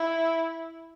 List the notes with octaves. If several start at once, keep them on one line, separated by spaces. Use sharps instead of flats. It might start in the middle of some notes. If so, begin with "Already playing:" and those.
Already playing: E4